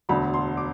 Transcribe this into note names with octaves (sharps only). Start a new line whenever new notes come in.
E1 D2 D3 B5
C6
D6